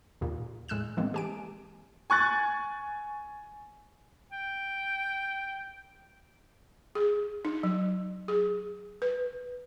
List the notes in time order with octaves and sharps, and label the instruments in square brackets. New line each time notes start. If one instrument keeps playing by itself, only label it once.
[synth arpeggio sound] D#2 A#2
A2 G#3 E6 F#6 E7
E3 G#3 A#3 C4
G4 G#5 D7
[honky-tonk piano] G#5 C#6 F#6 A6
[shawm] G5
[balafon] G#4
D#4
F#3
G#4
B4